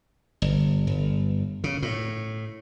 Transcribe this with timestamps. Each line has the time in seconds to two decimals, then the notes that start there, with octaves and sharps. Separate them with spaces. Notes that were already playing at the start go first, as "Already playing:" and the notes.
0.42 G1
0.87 G1
1.64 C#3
1.82 A2